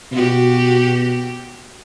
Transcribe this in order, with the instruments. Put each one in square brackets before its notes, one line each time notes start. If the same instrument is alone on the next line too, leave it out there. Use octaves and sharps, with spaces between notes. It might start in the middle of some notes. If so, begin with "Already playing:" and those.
[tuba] B2 [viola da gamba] F#4 G4